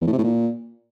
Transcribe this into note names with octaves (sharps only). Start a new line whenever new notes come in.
E2
A2
C3
A2
A#2